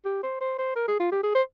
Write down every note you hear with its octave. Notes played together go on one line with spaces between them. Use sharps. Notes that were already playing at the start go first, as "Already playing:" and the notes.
G4
C5
C5
C5
A#4
G#4
F4
G4
G#4
C5